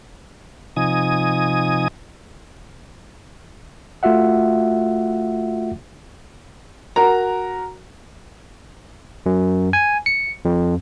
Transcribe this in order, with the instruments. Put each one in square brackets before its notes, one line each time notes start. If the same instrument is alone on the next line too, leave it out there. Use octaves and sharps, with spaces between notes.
[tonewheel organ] C3 F3 D#4 G#5 D#6
[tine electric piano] A3 F4 F#4 E5 F#5
[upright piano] F#4 A#4 A#5
[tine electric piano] F#2
G#5
C#7
F2